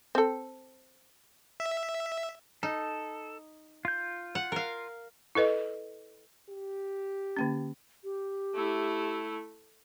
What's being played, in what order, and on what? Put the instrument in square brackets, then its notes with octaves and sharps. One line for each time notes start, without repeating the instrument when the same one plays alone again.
[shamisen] C4 A4
[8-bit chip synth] E5
[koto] D#4 [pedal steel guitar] A4
[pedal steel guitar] F4 G6
[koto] F#5
A#4 F5
[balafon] E4 A4 B4 D#5
[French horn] G4
[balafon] D3 A#3 C#4
[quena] G4
[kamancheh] A3 E4